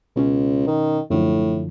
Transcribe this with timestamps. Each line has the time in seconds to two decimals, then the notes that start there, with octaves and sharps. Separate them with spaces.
0.16 C#2 B2 C#4
0.67 D#3
1.10 F#2 A2 D3 F3